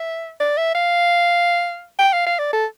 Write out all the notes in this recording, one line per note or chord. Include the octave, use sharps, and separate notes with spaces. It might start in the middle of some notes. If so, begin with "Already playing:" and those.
Already playing: E5
D5
E5
F5
G5
F5
F5
D5
A4